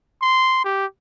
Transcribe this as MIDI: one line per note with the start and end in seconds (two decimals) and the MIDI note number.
0.22 0.63 84
0.64 0.86 67